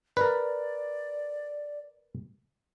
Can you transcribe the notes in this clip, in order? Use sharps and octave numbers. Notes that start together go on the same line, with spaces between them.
A#4 B4 D5